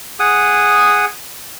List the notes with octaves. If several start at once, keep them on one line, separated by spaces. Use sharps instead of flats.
G#4 F#5 D#6